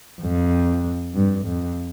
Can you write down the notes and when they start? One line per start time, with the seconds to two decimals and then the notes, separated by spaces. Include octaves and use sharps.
0.21 F2
1.14 G2
1.46 F2